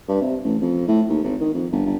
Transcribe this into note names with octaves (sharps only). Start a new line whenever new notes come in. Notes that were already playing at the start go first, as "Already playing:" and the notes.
G2
C3
A1
F2
A2
D#2
G#1
D#3
F2
G1
G1